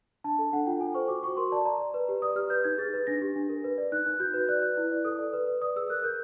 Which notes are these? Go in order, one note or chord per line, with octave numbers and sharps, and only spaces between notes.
D4 A5
A4
D4 F#5
F4 G5
A4 G#5
C5 C#6
F#4 D6
F#4 C#6
A#4 C6
D5 A5
D5 A#5
D5
B4
G4
D5 D#6
G4 F6
B4 G6
D#4 G#6
G#4 A6
B4
D4 A#6
G4
D4
A#4
B4
D5
D#4 F#6
D#4
F#4 G6
B4
D5 F#6
B4
E4
D5
A4 D#6
D5
B4
B4
D5 D#6
G#4 E6
A#4 F#6
A#4 G6